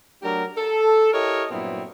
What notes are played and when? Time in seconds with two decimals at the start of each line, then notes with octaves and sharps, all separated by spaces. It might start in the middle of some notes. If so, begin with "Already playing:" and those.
0.22 F#3 A3 D4 G4 A#4
0.58 A4
1.13 E4 G4 A4 A#4 C#5 D#5
1.51 G2 A#2 F#3 B3 C4 E4